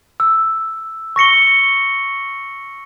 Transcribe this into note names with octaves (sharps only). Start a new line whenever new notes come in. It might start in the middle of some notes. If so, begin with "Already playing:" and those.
E6
C#6 A#6 C#7 G7